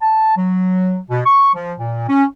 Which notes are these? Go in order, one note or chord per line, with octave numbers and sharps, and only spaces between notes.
A5
F#3
B2
C#6
F3
A#2
C#4